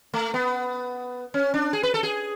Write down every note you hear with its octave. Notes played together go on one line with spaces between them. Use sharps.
A3
B3
C#4
D4
G#4
B4
A4
G#4